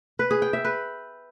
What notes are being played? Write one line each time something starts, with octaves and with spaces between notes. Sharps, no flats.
B4
G#4
G5
E5
B4